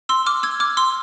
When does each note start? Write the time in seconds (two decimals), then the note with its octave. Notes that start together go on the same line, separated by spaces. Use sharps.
0.09 C6 E6
0.26 D6 F6
0.43 E6 G#6
0.60 D6 F6
0.77 C6 E6